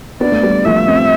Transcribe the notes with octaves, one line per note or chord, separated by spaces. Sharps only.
B3 D4 D5
A3
G3 B3
F3 A3 E5
A3 C4